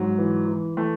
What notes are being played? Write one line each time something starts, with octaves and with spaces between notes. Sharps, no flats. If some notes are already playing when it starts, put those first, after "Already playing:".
Already playing: G#2 F#3
E3
E3
E3 A3